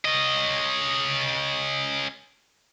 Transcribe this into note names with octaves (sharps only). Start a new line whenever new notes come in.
C#4 D#5